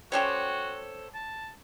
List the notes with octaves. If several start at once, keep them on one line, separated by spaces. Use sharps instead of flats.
G3 C#4 F#4 G4 A4 C5 C#5
A5